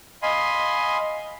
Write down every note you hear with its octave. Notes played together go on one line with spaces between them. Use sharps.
D#5 F5 G#5 B5 C6